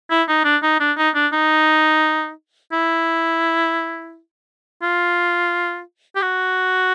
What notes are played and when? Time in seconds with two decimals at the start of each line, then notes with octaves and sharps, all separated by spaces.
0.10 E4
0.28 D#4
0.44 D4
0.63 D#4
0.80 D4
0.97 D#4
1.15 D4
1.33 D#4
2.72 E4
4.82 F4
6.15 G4
6.22 F#4